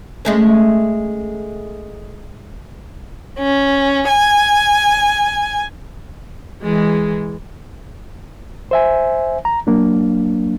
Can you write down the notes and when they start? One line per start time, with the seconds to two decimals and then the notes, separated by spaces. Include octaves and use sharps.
0.25 G#3 A3 C#4
3.39 C#4
4.08 G#5
6.62 E3 G#3
8.71 C5 E5 G#5
9.45 A#5
9.67 F#3 A#3 D4